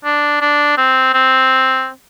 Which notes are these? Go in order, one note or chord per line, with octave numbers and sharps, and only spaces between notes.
D4
D4
C4
C4